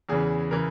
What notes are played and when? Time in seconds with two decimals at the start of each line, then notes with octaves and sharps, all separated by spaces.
0.09 E2 C#3 E3 G#4
0.51 C#3 E3 A#4